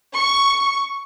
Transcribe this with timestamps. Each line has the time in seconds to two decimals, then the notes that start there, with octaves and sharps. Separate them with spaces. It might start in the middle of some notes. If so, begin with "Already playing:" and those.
0.15 C#6